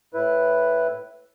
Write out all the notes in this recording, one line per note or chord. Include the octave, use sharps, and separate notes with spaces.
A2 E4 B4